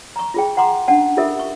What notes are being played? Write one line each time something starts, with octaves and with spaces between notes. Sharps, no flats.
A#5 C#6
F4 G#4 G5
F#5 A#5 C6 D6
C#4 D4 F#5 A5
F4 G4 A4 A#4 E5
C#6